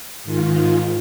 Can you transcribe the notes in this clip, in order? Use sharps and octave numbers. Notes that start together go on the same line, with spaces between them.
G#2 D#3 F4